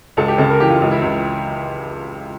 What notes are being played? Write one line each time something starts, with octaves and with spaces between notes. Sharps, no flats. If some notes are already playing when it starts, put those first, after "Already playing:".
C#2 A4
G4
C#3 A4
A#4
E3 G4
F4
C#2 F4
E4
C#2